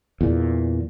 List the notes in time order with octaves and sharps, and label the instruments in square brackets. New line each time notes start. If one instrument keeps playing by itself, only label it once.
[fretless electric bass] E2 A#2